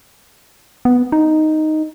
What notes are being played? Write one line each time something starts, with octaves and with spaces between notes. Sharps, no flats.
B3
D#4